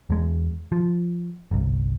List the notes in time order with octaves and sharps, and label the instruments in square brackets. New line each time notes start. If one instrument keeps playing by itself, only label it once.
[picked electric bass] E2 G#3
F3
G1 C2